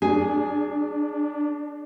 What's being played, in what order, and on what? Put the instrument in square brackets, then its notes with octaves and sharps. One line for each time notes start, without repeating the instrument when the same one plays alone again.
[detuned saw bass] D4 [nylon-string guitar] G#4